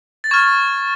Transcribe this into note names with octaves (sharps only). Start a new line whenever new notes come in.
A6
C#6 F6 G#6